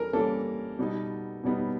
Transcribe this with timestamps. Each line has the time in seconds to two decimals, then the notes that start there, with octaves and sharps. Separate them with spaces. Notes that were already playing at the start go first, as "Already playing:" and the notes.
Already playing: E3 G3 A4 A#4
0.13 E3 G3 A#3 C#4 A4
0.79 B2 G3 B3 D#4
1.43 B2 G3 B3 D#4